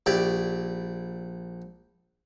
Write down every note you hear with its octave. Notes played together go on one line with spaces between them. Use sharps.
A#1 E4 G4 D5